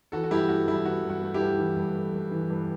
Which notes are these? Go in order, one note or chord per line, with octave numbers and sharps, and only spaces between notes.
E3 F#4 A4
F#4
G2 E4 G4
A3 F#4
G2 E4
E3 F#4
G2
F#4
A3
E4 G4
G2
E3
G2
A3
G2
E3
G2